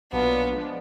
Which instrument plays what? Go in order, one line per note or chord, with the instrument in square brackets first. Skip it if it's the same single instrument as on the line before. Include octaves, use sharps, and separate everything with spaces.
[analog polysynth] B1 A#2 F#3 D4 F4 [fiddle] B3
[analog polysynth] F3 G#3 B3 D4